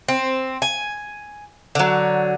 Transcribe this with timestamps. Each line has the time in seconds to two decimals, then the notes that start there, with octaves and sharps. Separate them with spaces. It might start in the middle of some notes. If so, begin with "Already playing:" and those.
0.08 C4
0.62 G#5
1.75 D3 F#3